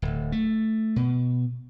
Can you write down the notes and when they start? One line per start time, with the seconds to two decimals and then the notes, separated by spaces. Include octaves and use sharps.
0.02 D1
0.32 A3
0.96 B2